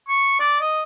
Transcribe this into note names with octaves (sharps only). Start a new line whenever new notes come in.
C#6
D5
D#5